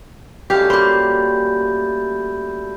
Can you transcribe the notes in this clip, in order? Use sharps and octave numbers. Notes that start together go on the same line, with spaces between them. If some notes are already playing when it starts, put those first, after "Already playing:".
F#2 G3 A3 G4 F5
A#3 C5 B5 G6